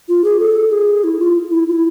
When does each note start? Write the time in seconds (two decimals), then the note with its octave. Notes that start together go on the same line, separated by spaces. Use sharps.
0.09 F4
0.24 G#4
0.39 A4
0.72 G#4
1.04 E4
1.20 F4
1.51 E4
1.68 F4
1.73 E4